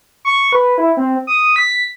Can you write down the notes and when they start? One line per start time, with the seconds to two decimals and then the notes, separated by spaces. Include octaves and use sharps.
0.25 C#6
0.52 B4
0.78 E4
0.97 C4
1.27 D#6
1.56 B6